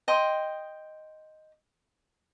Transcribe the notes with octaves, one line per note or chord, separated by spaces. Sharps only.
D#5 G5 C6